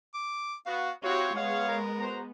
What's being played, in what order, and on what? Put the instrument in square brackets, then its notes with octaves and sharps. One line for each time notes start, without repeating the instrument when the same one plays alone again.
[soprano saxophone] D6
[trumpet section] B3 F#4 [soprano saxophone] F5
[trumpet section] C4 E4 C#5 [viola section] F#4 G4 [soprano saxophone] F5
[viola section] G#3 B3 [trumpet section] C#5 F5 [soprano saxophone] F#5
[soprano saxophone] A#4
[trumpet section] F#4 C5 A#5